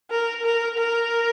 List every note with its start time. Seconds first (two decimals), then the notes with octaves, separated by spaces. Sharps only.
0.10 A#4
0.44 A#4
0.77 A#4